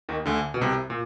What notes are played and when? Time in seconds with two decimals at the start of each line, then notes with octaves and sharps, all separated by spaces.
0.09 D#2 D#3
0.26 D2 D3
0.54 B2
0.61 C2 C3
0.90 A#2